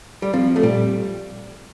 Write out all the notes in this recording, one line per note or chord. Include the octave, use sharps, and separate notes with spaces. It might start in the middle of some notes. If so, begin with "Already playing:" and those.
G3
F3 C4
F4
A3
A#2 G3